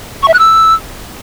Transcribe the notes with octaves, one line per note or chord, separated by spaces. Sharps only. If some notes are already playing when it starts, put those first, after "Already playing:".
C#6
E5
F#6
E6